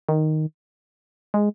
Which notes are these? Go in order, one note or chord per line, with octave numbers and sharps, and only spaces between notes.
D#3
G#3